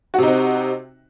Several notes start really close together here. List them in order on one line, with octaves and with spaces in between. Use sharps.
F#4 C3 D#4 C4